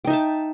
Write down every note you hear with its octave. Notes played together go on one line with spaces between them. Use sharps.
D#4 E5 G5 A5